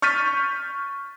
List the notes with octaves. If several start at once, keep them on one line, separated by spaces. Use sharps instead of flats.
C#6 F6 G6 A6 B6 D#7